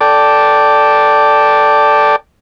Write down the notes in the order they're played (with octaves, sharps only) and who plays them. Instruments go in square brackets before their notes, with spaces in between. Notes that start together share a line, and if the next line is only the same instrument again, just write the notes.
[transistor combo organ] A4 D5 G5 A5 D6